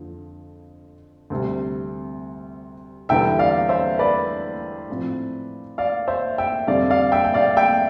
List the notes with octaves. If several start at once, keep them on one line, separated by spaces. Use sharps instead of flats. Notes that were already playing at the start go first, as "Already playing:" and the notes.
Already playing: F2 D3 F3
D2 C3 G3
E2 D3 G3 B3 E5 G5
D5 F5
C5 E5
B4 D5
A2 F3 C4
D5 F5
C5 E5
E5 G5
F2 D3 G3 C4 D5 F5
D5 F5
E5 G5
G5
D5 F5
E5 G5